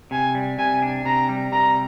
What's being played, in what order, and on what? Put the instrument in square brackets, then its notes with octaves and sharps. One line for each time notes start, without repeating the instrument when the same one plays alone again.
[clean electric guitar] C3 [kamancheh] G#5
[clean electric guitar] G3
[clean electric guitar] C3 [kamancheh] G#5
[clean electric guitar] D4
[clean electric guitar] C3 [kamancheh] A#5
[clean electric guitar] G3
[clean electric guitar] C3 [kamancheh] A#5